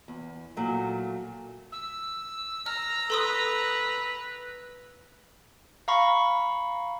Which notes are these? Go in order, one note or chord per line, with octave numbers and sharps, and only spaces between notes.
E2
A#2 F#3 A3
E6
A#5 F6
A4 B4 C6 D#6
F5 A#5 B5 C#6